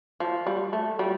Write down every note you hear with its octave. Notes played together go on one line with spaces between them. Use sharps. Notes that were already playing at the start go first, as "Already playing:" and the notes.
F3
G3
A3
G3